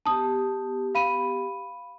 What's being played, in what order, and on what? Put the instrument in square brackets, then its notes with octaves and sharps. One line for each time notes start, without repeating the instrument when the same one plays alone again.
[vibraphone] B3 G4 [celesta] A5 D#6
[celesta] F5 B5 D#7